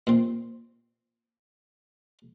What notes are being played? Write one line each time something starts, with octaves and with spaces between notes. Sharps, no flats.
A#2 C4